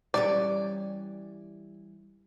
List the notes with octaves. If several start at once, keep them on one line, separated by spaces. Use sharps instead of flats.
E3 G3 C#4 D5